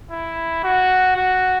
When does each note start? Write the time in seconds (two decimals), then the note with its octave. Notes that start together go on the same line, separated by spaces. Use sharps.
0.11 E4
0.64 F#4
1.16 F#4